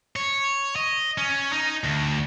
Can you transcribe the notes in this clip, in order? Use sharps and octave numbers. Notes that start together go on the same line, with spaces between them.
C#5
D#5
C#4
D#4
D2